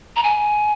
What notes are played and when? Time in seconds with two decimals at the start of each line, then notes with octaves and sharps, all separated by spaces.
0.16 A#5
0.24 G#5